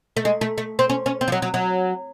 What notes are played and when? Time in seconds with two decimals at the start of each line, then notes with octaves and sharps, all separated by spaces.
0.17 A3
0.25 G#3
0.41 A3
0.58 A3
0.79 C4
0.90 C#4
1.06 C#4
1.21 C4
1.28 F3
1.32 F#3
1.42 F#3
1.54 F#3